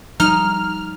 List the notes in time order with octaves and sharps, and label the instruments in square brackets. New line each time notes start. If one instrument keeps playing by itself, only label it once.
[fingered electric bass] F3 G3 [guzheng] D#4 [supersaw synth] F6